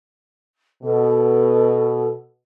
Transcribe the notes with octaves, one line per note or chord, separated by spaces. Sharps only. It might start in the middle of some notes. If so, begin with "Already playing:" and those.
B2 A4